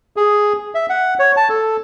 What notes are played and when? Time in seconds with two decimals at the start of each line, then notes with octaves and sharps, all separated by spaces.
0.17 G#4
0.75 E5
0.90 F#5
1.19 C#5
1.37 A5
1.49 A4